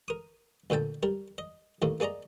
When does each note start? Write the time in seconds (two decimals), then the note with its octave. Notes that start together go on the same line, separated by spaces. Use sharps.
0.08 A#4 D#6
0.70 D2 A#2 D3 G5 A5
1.03 G3 A#4
1.38 D#5
1.82 D#2 A2 D#3 A#3
2.00 A#3 G#4 D5 D#5 A#5